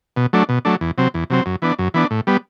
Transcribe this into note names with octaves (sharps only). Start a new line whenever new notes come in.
B2
F#3 A3 D4
B2
F#3 A3 D4
E2
C3 F#3 C4
E2
C3 F#3 C4
F#2
E3 B3 D4
F#2
E3 B3 D4
A2
G3 B3